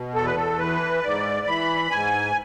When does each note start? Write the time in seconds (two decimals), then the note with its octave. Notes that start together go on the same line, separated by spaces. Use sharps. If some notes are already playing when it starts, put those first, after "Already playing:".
Already playing: B2
0.15 E2 A4
0.25 B4
0.36 A4
0.59 E3 B4
1.03 G#2 D5
1.47 E3 B5
1.91 G#2 G#5